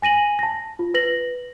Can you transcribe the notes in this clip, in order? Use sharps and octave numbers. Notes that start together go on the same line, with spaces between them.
G#5 A#6 D#7 F#7
A5 A#6
F4
B4 A#6 F#7